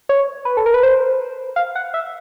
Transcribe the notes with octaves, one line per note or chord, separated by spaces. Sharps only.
C#5
B4
A4
A#4
B4
C5
F5
F#5
E5